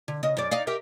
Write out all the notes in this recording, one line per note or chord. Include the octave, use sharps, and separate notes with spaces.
D3
C#3 D#5
F#2 D5
D#4 D5 F5
G4 A#4 E5